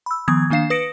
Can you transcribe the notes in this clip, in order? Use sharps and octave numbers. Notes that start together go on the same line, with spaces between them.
B5 E6
D#3 F3 B3 D#6 G#6
D#3 A#3 D4 F5 C7 E7
B4 D#6 A#6 C#7 D7